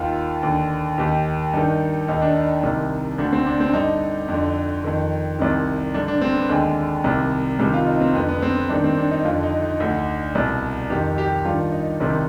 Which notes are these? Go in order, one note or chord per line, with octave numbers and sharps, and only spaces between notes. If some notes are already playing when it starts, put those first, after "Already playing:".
Already playing: D#2 D#3 F4
D#2 D3
D#2 D#3 G4
G2 D#3
D#2 D#3 D#4
D4
D#4
C2 C3 D#3
D2 D3 D4
C4
D4
C4
G2 D3 D#4
F2 D3
F2 D#3
C2 C3 D#3
G2 D3 D4
D4
C4
B3
D#2 D3 G#3
C2 C3 D#3
C2 C3 D#3 G3
F4
D#4
C4
F2 D3 B3
B3
C4
B3
G2 D#3 D4
C4
D4
D#4
F2 D3 F4
D#4
D#4
D2 D3
C2 B2
F2 D#3 G4
G4
G2 D#3 F4
D#4
C2 C3 D#3